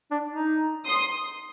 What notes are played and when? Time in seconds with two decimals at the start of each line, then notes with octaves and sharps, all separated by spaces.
0.11 D4
0.29 D#4
0.85 C6 D#6